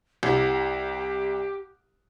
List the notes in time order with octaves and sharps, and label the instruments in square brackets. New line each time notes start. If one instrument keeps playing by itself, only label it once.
[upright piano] C2 [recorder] G4